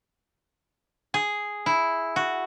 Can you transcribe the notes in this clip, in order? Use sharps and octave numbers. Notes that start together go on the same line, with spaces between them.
G#4
E4
F#4